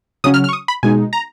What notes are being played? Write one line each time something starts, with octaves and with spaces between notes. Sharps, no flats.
C#3 F#3 C#4 D#6
F6
F6
C#6
D#6
B5
B2 G#3 D#4 G#5
A#5